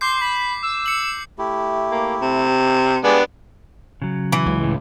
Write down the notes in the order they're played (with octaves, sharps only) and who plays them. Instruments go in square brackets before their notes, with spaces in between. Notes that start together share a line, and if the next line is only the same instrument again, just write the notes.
[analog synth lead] C6 [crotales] D6 G6 C7
[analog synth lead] B5
E6
[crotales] C#7 F#7
[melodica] A3 E4 G4
[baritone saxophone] A#3
C3
[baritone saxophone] G#3 [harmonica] B3 D4 B5 [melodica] G4 B4 D5
[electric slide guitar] C#3 F#3
[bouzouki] E3
[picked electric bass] C#2
[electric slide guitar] A2